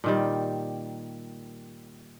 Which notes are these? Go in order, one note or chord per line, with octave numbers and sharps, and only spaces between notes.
A#2 D#3 G3